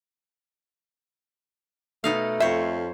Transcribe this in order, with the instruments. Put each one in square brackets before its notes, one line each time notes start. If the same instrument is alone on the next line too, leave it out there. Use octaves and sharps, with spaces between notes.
[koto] B2 D#4 F5 [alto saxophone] A3
[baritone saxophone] F2 [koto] C5 C#5 [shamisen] E5